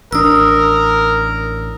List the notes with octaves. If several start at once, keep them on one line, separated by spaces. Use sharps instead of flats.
A1 D4 A#4 D#6 E6